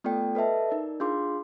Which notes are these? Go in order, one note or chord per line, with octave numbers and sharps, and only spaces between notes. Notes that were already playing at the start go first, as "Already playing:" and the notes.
A3 B3 F4 A4 D5 G5
A4 B4 D#5 E5 A5
D#4 A#4 D5
D4 F4 G#4 F5 C6 D6